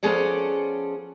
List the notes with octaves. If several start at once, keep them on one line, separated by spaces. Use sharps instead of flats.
F3 B3 C#4 G#4 A4 D5